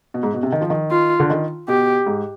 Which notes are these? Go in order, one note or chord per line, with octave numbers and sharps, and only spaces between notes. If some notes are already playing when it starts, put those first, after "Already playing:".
B2
G#2
B2
C3
D#3
F3
D#3
F4
D3
D#3
B2 G4
G#2